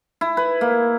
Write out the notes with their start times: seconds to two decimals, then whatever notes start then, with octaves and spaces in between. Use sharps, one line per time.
0.21 E4
0.37 B4
0.61 A#3